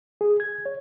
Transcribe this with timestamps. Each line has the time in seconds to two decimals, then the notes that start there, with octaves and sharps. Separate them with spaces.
0.21 G#4
0.40 G#6
0.66 C#5